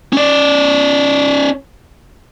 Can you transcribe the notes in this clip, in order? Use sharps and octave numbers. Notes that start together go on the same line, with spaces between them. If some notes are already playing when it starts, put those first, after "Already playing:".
C#4 D5